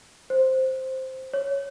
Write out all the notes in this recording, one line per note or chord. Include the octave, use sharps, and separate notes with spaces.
C5
C#5